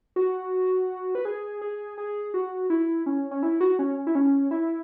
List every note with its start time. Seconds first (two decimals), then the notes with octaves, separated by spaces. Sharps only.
0.16 F#4
1.15 B4
1.25 G#4
1.61 G#4
1.98 G#4
2.34 F#4
2.70 E4
3.06 C#4
3.31 C#4
3.43 E4
3.61 F#4
3.79 C#4
4.07 E4
4.15 C#4
4.51 E4